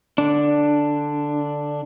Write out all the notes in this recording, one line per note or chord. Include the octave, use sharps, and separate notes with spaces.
D3 D4